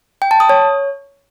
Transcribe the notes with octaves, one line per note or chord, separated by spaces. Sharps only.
G5
A5
D#6
C#5